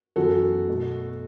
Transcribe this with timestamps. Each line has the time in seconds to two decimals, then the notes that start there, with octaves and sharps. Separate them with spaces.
0.16 F#2 E3 B3 F#4 A4
0.68 B2 A3